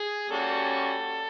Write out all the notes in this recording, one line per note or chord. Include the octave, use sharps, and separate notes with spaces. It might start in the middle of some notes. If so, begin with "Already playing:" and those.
Already playing: G#4
G3 A#3 C#4 F#4 A4